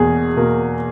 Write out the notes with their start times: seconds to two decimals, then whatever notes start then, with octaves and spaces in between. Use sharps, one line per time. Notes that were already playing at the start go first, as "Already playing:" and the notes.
Already playing: E2 B2 A#3 G#4
0.36 B2 A#3